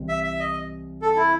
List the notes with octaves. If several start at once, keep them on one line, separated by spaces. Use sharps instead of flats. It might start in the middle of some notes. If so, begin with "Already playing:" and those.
Already playing: C2 C3 E3 C4
E5
E5
D#5
A4
E4